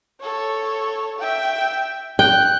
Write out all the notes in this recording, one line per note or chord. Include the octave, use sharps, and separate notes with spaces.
A4 C#5
E5 G5
G5 F#6